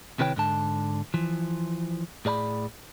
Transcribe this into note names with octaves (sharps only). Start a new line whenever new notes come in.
C3 D#3 E4 B4 C#5 G5
G#2 D3 A5
E3 F3
A2 G#4 D5 A#5 B5